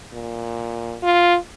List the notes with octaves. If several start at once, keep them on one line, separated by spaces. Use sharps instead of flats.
A#2
F4